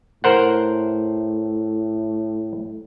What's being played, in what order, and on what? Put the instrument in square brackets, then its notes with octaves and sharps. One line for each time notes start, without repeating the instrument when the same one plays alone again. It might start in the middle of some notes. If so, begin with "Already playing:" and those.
[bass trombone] A2 [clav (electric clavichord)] A#4 C5 F#5